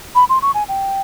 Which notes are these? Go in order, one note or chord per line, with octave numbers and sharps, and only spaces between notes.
B5
C6
C#6
G#5
G5